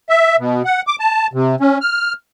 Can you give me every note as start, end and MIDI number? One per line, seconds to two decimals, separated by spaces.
0.09 0.36 76
0.39 0.62 47
0.65 0.82 78
0.87 0.96 86
0.99 1.27 81
1.33 1.55 48
1.60 1.78 61
1.81 2.13 89